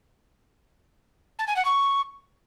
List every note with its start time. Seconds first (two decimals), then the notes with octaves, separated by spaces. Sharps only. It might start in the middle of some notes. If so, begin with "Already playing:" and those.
1.39 A5
1.48 G#5
1.56 F#5
1.65 C#6